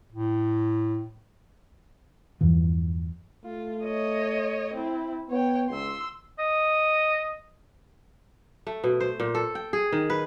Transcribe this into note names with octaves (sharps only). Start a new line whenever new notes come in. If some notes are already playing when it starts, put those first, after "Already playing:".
A2
E2 G2 E3 F3
A3 F4
C#5 D#5
C4 E4
B3 C#5 G5
C#2 C6 E6
D#5
A3
B2
C5
A#2
A4
G5
G#4
D#3
B4